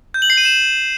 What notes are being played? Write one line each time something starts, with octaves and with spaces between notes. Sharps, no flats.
G6
F#7
C7
D#7
E7